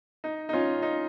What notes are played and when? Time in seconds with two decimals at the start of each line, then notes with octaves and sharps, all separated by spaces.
0.24 D#4
0.49 D#4
0.53 C#4 F4
0.82 D#4